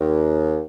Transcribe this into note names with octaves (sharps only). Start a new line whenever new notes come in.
D#2